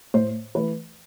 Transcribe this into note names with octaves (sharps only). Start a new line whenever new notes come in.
A2 C5
E3 A3 B4